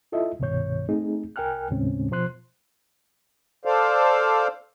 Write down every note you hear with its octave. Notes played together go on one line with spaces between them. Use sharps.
E4 F4 A4 D#5 E5
C2 G2 B2 D#3 C#5 G6
A3 C4 D#4 G#4
C2 A#4 G5 G#5 F6 F#6
D#2 A2 C#3 G#3 C4 C#4
B2 F3 C5 C6 F#6
A4 C5 D5 F5